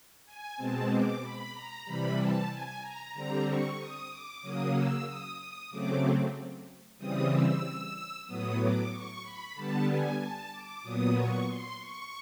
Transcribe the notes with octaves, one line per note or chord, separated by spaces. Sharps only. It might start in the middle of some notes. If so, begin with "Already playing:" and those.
G#5
B2 G#3 C4 A5
D6
B5
A#5
C3 E3 G3 B5
A5
G#5
A#5
D3 G3 C4 A#5
C#6
D#6
D6
C#3 F#3 A#3 D#6
E6
D#6
D#6
C#3 F#3 A3 C4 D6
C#3 E3 G3 C4 D#6
E6
A2 F#3 B3 D#6
D6
C#6
B5
D3 G3 B3 A5
G#5
A5
D6
A#2 F#3 B3 D#6
C#6
C6
C#6